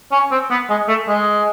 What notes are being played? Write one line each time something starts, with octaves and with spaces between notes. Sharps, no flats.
C#4
C4
B3
G#3
A3
G#3